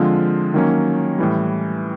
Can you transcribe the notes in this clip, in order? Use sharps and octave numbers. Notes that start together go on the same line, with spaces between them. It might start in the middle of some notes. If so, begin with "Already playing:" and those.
Already playing: D3 F3 G#3 C4 F4
D#3 F#3 A#3 C#4
A2 E3 G3